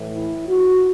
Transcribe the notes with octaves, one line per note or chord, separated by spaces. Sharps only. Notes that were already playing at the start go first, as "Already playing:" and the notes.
Already playing: A2 E3
E4
F#4